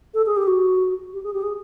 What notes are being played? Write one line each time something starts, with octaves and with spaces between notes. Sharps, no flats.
A4
G#4
G4
F#4
G4
G#4
G4
G#4